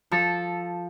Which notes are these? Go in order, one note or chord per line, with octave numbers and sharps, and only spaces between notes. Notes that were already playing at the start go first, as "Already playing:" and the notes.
F3 A4